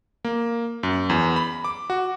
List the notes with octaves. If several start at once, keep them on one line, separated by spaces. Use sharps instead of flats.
A#3
F#2
E2
B5
D6
F#4